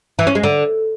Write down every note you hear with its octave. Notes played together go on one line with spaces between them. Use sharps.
E3
C#4
G#3
D3